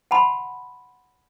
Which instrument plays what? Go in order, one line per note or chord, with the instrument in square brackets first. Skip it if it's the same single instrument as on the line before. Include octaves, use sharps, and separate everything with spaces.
[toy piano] F#5 A5 B5 C6